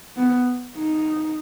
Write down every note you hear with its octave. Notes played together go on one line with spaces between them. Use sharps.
B3
D#4